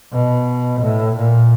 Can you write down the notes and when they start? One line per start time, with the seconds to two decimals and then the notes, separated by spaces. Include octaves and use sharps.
0.13 B2
0.81 A2
1.16 A#2